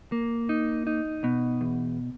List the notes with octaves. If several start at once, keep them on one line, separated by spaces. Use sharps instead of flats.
A#3
D#4
D#4
B2
E2